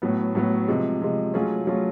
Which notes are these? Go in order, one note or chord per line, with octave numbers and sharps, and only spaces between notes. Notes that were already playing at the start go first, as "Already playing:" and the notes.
A2 F#3 B3
A2 F#3 B3
C3 F3 G#3
C3 F3 G#3
F#3 A3 C#4 F4 G#4
F#3 A3 C#4 F4 G#4